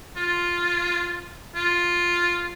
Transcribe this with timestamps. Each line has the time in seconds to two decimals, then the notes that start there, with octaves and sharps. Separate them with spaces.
0.16 F4
1.55 F4